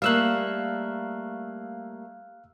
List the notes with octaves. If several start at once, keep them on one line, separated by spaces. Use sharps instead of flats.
G3 A3 A#3 F5 E6 F#6